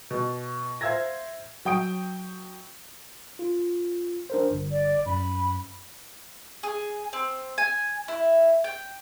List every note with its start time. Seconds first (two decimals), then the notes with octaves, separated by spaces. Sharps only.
0.11 B2
0.81 C5 E5 F5 E6 G#6 A#6
1.65 F#3 G5 D#6 D7
3.39 F4
4.30 D4 A#4 C5
4.51 G1
4.71 D5
5.06 F#2 B5
6.63 G#4
7.13 C4
7.58 G#5
8.08 E4
8.64 G5